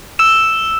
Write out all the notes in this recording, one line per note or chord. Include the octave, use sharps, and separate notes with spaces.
E6 E7